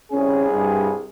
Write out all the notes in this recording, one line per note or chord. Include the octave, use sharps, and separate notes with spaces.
C2 C#4 G#4
G2